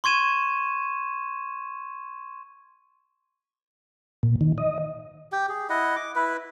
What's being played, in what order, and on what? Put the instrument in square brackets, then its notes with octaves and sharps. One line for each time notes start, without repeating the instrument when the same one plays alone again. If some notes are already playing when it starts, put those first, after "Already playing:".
[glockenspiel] C6 C#6 G#6 D#7 E7
[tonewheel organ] A#2
D#3
D#5
[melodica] G4 G5
G#4
E4 D#5 F#5
D6
E4 B4